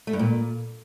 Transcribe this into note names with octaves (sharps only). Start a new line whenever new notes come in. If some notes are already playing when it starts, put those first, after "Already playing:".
A3
G2
A#2